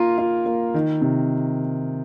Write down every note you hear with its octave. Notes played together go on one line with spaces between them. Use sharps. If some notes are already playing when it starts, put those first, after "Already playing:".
Already playing: A#3 F4 A#4
F4
A#3
D#3
C3